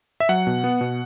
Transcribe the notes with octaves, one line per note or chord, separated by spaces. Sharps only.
E5
F#3 F#5
B2
B3
B2